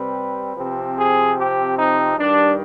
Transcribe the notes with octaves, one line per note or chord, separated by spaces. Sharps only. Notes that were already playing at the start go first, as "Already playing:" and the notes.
Already playing: C3 G3 C4 B4
C3 F3 C4
G#4
G4
D#4
G2 D#3 G3 D4